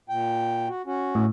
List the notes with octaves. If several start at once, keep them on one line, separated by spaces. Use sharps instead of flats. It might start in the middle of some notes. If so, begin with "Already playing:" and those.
A#2 G5
F#4
C#4 F#4
A2